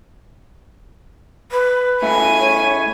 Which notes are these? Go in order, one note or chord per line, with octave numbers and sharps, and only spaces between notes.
B4
C#3 A3 E4 G#5 D#7
C#5